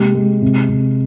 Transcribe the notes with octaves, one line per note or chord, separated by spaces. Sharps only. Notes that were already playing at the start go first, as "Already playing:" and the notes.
Already playing: C3 G#3 A#3 G4
G#3
C3
C3